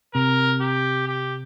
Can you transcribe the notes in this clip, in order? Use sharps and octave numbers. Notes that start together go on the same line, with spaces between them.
C3 A#4
G4
G4